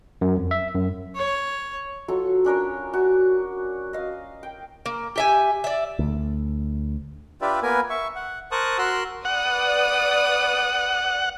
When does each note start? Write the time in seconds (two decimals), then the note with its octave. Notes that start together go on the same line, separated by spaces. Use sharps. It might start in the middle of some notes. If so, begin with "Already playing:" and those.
0.21 F#2
0.37 F2
0.51 E5
0.75 F#2
1.16 C#5
2.08 F#3 F4 A4 C#6
2.45 C#4 D4 A#4 C#5
2.93 F#4
3.93 D#5 F5 D#6
4.43 G5
4.86 A#3
5.16 G4 E5 G#5
5.64 D5 E5
5.99 D2
7.41 D4 F4 G4 B4 D5 E5
7.63 A#3 B3 A#4 B4 G#5
7.90 E5 C#6
8.16 F#5
8.52 A#4 C5 A5 C#6 D#6 F#6
8.78 F#4 A#4 C6 E6 F#6
9.25 B4 D5 F#5 D#6